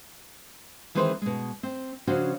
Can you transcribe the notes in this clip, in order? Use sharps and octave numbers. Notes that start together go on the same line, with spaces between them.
D#3 E3 G#3 C4 B4 C5
B2 G#3
C4
C#3 F3 C#4 D4 F#4 C5